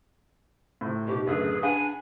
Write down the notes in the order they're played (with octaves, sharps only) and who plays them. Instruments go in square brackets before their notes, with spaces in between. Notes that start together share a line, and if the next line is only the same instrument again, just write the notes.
[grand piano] A2 C3
[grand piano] B2 D#4 [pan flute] G4
[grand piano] A1 F#2 D3 [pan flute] G#4 [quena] B4
[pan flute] D4 [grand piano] B4 F#5 [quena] G#5